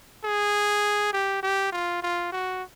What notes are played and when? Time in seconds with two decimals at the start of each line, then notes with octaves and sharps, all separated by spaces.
0.24 G#4
1.13 G4
1.42 G4
1.72 F4
2.02 F4
2.32 F#4